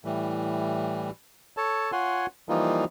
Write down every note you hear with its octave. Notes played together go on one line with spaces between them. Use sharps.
A2 E3 G3
A4 C#5 A5
F4 C#5 F#5 G#5 C6
E3 F3 G3 A#3 D#4 F4